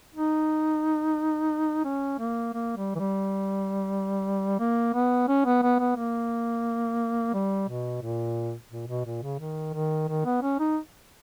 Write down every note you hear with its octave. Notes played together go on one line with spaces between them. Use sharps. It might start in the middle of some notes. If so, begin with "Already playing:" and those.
D#4
C#4
A#3
A#3
G3
E3
G3
A#3
B3
C#4
B3
B3
B3
A#3
G3
B2
A#2
A#2
B2
A#2
C#3
D#3
D#3
D#3
B3
C#4
D#4